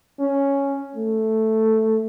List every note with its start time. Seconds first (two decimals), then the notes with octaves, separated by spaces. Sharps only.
0.19 C#4
0.95 A3